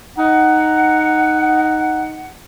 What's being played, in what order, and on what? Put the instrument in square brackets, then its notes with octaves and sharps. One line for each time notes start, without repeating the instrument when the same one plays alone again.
[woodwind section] D#4 F#5